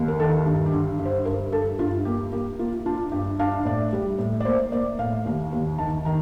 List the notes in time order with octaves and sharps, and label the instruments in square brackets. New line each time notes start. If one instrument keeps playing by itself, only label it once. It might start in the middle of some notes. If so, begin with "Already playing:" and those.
Already playing: [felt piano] D#2
A#4
D#3 A4
G2
G4
D3
G2
C5
G2 A#4
G2 A4
G2 F4
A#3 G4
A#3 G4
A#3 F4
D4 F4
G2 G4
D4 F5
A2 D5
G3
A2
D5
A#3 C5
A#3 D5
A2 F5
D#2 F5
D#2
D#3 A5
D#3 A#5